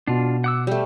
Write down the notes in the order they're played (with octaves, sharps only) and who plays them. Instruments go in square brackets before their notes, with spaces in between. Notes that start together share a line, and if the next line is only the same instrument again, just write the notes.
[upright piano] B2 [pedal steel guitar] D4 F4
[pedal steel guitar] F#5 D6 E6
[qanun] G3 A3 [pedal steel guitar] C5